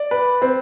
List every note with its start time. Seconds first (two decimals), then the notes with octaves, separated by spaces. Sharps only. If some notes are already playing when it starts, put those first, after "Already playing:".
Already playing: D5
0.11 B4
0.42 C4